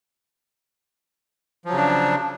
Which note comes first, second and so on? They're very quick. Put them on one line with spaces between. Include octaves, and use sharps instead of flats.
F3 F#3 C#3 D4